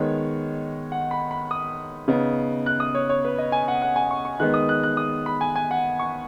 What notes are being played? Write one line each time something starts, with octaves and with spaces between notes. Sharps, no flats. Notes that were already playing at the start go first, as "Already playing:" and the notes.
Already playing: D#3 G#3 B3 C#5
F#5
B5
B5
D#6
C#3 B3 D#4
F#6
D#6
C#5
C#5
B4
D#5
G#5
F#5
F#5
G#5
C#6
C#6
D#3 G#3 B3 D#4 F#6
D#6
F#6
F#6
D#6
B5
G#5
G#5
F#5
C#6